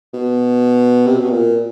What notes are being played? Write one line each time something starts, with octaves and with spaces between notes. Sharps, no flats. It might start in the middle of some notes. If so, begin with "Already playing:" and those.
B2
C3
B2
A#2